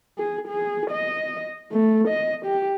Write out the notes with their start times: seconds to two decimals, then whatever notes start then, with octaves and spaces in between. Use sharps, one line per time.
0.18 G#4
0.48 G#4
0.90 D#5
1.71 A3
2.08 D#5
2.45 G4